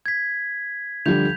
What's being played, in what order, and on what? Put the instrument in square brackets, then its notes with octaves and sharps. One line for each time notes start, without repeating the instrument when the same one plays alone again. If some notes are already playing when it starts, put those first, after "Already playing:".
[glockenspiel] G#6 B6
[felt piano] D3 F3 G3 [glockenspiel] G6 F7